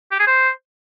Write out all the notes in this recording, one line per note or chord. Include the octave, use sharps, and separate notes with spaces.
G4
G#4
C5